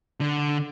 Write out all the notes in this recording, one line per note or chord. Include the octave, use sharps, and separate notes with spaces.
D3